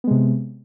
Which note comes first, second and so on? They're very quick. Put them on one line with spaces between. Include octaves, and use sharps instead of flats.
B3 G#3 C3